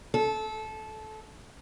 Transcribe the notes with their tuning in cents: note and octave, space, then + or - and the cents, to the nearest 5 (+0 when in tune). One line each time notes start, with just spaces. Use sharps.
A4 -20